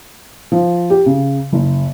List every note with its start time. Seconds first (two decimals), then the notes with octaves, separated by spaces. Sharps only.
0.52 F3
0.90 G4
1.06 C#3
1.52 F#1